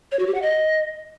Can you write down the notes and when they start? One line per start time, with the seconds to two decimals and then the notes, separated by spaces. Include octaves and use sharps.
0.12 C#5
0.19 F#4
0.27 G4
0.35 F#5
0.42 D#5